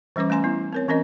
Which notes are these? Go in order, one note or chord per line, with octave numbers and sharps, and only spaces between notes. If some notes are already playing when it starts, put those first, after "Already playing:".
E3 G3 C#4 B4 D6
A3 C#4 G#5 C6
B3 E4
C4 A#4 C#5
E3 C4 C#4 A#4 D#5